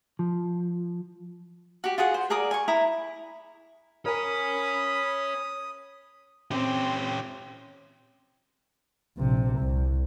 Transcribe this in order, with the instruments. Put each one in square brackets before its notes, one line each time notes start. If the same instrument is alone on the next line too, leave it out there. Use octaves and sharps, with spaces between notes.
[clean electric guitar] F3
[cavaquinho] F#4 G4
F4 F#4 G#4 F#5
C5
G#4 A#4 D5 D#6
G#5 C#6
E4 A#5 D#6
[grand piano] A#4 [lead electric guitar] C#5 G#5 [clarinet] B5 [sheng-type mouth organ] D#6
[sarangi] C4 [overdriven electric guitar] C#4 G4
[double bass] A#1 C3
C2